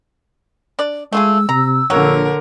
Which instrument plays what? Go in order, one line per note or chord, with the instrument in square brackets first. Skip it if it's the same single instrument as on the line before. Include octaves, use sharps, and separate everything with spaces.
[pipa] D4 D5
[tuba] G#3 [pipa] A3 F4 G#4 [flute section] E6
[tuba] C3 [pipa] A#5
[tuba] A#1 [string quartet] D3 A#4 [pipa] F#3 A#3 C#5